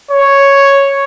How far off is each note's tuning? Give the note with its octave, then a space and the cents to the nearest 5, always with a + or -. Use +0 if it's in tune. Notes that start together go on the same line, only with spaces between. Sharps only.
C#5 +0